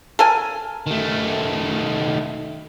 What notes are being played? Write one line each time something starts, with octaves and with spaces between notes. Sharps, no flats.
A4 A#4 G#5
D#3 A3